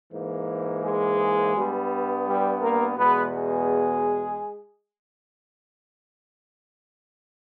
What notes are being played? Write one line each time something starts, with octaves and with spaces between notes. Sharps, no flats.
G#2 E3 A#3
G#3 G#4
G2 G3 B3
G3 G4
A#3 A#4
E2 B2 G#3 B3 B4
G#3 G#4